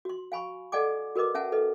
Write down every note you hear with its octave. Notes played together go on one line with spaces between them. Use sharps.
F#4 C6
F5 G#5 B5 C#6
A4 D5 D#5 F#5 G#5 D6
F#4 A#4 B4 D#5 D6
C#4 E5 F#5 G#5 A5
A4 B4 D#5